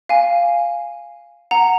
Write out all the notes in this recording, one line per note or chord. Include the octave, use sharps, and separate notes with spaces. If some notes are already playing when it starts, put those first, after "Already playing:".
F5 G#5
F#5 A#5